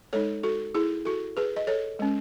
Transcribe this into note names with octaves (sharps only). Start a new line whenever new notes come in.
G#3 D#4 A4 C#5
F#4 A4
E4 G#4
F#4 A4
G#4 B4
D#5
A4 C#5
G#3 C#4